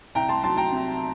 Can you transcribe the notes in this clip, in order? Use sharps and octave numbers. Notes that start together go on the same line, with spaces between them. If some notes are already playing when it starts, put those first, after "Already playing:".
C2 G5 A#5
A5 C6
F#3 A5 C6
G5 A#5
C3